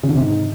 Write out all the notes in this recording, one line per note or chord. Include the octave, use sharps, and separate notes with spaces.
C#3
D3
C3
G#2